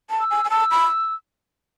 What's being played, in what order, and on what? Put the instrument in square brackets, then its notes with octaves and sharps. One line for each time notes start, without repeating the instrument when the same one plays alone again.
[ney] A5
[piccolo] E6
[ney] G#5
G#5
[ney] A5 [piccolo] E6
[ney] B5